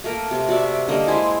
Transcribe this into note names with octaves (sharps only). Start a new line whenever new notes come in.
A3 A#3 A#4
C3
F#4 D5 E5
D3 G3 A#3 D#5
G#3 E4 G#4 C5